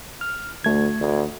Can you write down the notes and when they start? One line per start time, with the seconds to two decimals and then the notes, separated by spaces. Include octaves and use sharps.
0.21 F6
0.64 D2 A3 G#6
1.00 D2